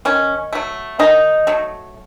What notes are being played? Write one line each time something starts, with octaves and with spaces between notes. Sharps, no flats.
D#3 C#4
F#3 A3
D#3 D#4
F#3 A3